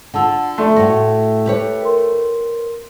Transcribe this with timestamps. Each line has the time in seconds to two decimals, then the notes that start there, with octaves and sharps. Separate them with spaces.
0.14 D3 F4 F#5 A5 E6
0.58 A3 A4 D5 C6
0.76 A2 F#4 A#6
1.46 G4 B4 C#5
1.82 A#4 C6